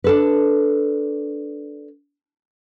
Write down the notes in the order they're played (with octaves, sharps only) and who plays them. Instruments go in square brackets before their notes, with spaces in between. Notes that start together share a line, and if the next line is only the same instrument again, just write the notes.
[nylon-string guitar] D4 A4 B4